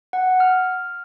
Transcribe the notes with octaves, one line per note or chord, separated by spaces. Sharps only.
F#5
F6